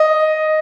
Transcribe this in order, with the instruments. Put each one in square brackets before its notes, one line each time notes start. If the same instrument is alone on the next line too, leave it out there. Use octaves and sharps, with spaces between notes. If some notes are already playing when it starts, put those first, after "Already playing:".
Already playing: [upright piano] D#5